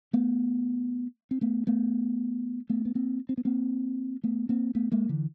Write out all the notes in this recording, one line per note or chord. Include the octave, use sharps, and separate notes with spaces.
A3 B3
C4
A3 B3
A3 B3
A3 B3
B3
A#3 C4
C4
B3
A#3 C4
A3 B3
A#3 C4
A3 B3
G#3 A#3
D3 E3